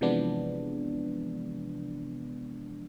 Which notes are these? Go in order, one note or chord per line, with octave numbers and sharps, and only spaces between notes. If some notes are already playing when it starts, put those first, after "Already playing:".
C3 E3 F3 G#3 B3 D4